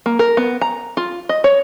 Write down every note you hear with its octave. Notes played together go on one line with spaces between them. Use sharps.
A#3
A#4
B3
A#5
F4
D#5
C#5